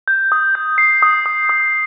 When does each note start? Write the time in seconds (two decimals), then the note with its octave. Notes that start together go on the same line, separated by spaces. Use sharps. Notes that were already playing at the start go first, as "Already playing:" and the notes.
0.08 G6
0.32 D#6
0.55 G6
0.78 C7
1.02 D#6
1.26 D#6
1.49 D#6